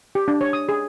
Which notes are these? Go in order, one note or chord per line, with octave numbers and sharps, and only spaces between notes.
G4
D4
C#5
D#6
G#4